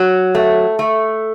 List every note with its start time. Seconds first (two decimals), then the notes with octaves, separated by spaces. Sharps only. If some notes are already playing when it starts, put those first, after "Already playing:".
Already playing: F#3
0.35 A3
0.79 A3